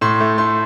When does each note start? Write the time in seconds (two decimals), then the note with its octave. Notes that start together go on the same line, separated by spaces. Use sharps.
0.01 A2 C6
0.21 A3
0.38 A3 C6